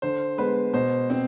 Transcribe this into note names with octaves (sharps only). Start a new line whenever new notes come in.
D3 C5
G#3 B3 B4
B2 C5
C4